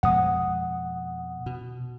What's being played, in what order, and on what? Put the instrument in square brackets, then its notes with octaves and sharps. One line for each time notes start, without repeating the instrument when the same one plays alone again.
[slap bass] F2 B2 G#3 [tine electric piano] F#5 D#6
[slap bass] B2